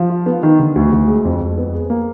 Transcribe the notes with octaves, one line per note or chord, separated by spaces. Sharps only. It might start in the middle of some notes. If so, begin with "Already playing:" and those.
Already playing: F3
F4
B3
D#3
D3
D2
D2
G#3
F2
F2
B3
G#4
A#3